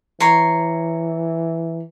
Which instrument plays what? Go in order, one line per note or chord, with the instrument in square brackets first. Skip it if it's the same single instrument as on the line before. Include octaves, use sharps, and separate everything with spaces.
[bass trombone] E3 [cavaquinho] C#5 A#5 C6